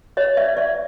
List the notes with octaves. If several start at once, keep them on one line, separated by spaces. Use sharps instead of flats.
C#5 D#5
D5 E5
D5 E5